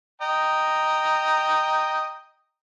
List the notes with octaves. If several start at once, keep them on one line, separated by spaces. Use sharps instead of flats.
D#5 G5 A#5